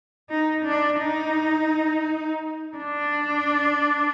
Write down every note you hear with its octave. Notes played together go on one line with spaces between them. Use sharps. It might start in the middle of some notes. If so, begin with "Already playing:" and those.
D#4
D4
D#4
D4